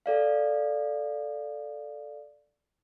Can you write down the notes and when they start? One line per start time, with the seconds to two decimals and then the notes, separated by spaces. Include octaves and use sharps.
0.06 A4 D5 F5